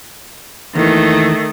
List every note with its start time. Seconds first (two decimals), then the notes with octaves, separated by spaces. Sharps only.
0.75 D#2 D#3 E3 A3